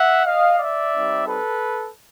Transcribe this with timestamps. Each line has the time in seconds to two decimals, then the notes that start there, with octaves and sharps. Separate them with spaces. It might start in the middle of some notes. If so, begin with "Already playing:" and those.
Already playing: E5 F#5
0.26 D#5 F5
0.59 D5 E5
0.93 G3 C4 D#4
1.26 A4 B4